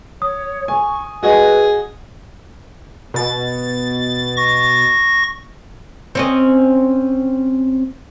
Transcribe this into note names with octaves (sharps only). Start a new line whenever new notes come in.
C#5 D#6
G#5 C#6
F#4 G#4 B4 D#5 G#5
B2 A6
C#6 A#6
C4 C#4 D#5